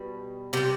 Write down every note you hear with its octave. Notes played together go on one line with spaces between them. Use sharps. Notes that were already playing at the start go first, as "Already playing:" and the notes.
Already playing: B2 G3
C3 G3 G4